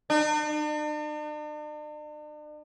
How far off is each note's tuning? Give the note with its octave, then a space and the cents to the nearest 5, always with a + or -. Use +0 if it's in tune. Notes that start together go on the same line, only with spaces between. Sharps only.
D4 +45